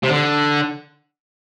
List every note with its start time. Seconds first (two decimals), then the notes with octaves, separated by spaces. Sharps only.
0.03 C3
0.09 D3